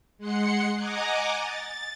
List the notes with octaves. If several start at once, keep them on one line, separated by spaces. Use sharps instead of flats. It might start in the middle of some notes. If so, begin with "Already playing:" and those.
G#3 F#5 C6 C#7
D#5 F#5 G#5 A#5 D6 D#6
A6